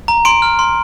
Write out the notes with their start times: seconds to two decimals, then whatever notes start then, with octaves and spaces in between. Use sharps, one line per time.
0.08 A#5
0.25 C6 D7
0.42 F6
0.59 C6